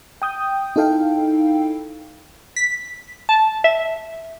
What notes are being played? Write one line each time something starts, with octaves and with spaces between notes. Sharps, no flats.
G5 D#6 G6
D#4 E4 A4 F5 G5
B6
A5
E5